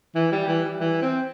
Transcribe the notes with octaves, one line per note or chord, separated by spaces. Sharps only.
E3
G3
E3
G3
E3
C4